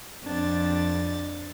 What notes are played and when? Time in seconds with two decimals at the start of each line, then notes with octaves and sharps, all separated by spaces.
0.24 F2 C4 D4 A6